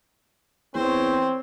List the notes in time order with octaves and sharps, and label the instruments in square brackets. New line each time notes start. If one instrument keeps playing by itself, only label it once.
[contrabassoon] E2 [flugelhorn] C4 [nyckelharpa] C5 C#5